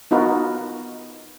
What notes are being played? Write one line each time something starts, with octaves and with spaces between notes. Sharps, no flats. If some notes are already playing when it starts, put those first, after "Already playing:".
B3 D#4 F4 F#4 A#4 B4